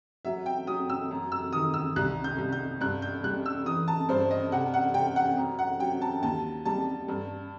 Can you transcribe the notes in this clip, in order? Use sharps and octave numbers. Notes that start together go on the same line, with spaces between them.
F#3 E5
G5
F#3 D#6
E6
F#2
E6
D#3 D#6
E6
C2 F#6
G6
C2
G6
G2 F#6
G6
G3 F#6
E6
E3 D#6
A5
G2 C5
D#5
C3 F#5
F#5
C3 G5
F#5
F#2
F#5
F#3 G5
A5
D#2 A5
G3 A5
G2